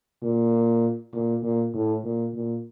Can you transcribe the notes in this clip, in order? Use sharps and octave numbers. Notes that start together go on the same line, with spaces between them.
A#2
A#2
A#2
A2
A#2
A#2